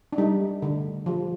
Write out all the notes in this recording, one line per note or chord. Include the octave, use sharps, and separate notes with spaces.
D4
G3 D#4
D3
F3